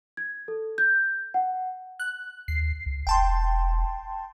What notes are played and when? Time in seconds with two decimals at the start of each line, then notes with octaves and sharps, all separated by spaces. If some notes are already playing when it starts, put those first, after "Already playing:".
0.17 G#6
0.48 A4
0.78 G6
1.34 F#5
1.99 F#6
2.48 D#2 C7
2.86 C#2
3.07 E1 G5 A5 C6